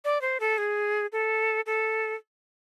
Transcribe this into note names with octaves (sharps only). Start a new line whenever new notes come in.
D5
C5
A4
G#4
A4
A4